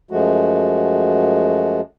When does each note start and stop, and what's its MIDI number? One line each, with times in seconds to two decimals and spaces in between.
0.11 1.81 42
0.11 1.81 53
0.11 1.81 56
0.11 1.81 57
0.11 1.81 66